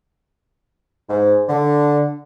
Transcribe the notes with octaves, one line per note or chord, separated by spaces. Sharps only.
G#2
D3